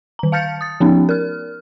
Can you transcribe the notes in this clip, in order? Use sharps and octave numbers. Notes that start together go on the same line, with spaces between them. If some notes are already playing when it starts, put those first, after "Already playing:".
D#3 A#5
F5 A5 F6 G6 A6 C#7
D#6 A6
F3 B3 C#4 D#4
A#4 F6